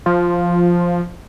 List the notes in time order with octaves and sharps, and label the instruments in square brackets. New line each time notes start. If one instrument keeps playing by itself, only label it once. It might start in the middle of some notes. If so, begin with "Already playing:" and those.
[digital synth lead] F3